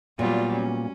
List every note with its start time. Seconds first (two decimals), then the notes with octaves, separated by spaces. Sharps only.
0.19 A#2 F#3 G3 B3 F4
0.54 C#4